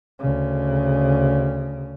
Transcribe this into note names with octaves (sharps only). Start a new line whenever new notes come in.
D2 C#3